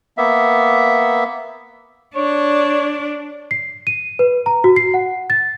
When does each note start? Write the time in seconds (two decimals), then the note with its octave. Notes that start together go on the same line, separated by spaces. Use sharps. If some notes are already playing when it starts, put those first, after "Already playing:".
0.18 A#3 B3 E5
2.15 D4 C#5
3.51 C7
3.87 D#7
4.19 B4
4.46 A#5
4.64 F#4
4.76 C7
4.94 F#5
5.30 A6